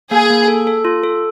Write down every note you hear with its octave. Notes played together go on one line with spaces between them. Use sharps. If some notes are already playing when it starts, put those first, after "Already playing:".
A#3 G#4
A#3
A4
A4
F4
A4